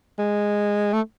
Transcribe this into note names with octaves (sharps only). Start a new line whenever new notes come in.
G#3
A3